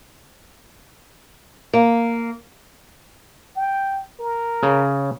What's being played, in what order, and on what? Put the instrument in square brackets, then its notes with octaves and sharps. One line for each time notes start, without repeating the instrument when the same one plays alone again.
[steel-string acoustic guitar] A#3
[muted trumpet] G5
A#4
[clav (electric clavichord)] C#3